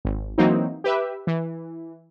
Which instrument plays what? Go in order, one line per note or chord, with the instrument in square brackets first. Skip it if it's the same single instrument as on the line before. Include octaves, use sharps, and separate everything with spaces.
[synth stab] G#1
E3 F#3 A#3 C4 D#4
G4 B4 E5
E3